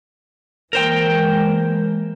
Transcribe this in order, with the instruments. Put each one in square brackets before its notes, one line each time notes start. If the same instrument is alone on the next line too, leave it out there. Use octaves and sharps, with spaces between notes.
[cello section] E3 G#3 A#3 [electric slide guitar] A#4 C5 G5